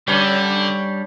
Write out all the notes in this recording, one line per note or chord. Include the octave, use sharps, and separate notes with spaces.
D3 G3 C#4 D4 C#5